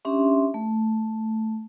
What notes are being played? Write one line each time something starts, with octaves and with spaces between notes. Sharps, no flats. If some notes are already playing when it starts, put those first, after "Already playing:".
C#4 D4 G4 E5 C6
A3